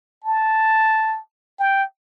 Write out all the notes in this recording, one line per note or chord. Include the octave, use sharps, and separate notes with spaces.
A5
G5